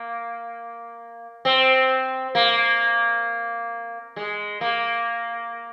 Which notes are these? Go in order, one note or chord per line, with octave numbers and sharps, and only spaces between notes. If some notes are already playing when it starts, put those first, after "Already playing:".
Already playing: A#3
C4
A#3
G#3
A#3